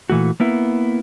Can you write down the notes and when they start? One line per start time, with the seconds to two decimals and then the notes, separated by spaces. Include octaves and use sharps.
0.10 A#2 E3 A3 F#4
0.40 A#3 B3 E4